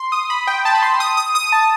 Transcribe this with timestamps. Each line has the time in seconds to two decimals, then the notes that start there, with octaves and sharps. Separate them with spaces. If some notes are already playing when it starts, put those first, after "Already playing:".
Already playing: C6
0.12 D#6
0.30 B5
0.47 G5
0.65 A5
0.75 B5
0.82 C6
1.00 D#6
1.17 D#6
1.35 D#6
1.52 A5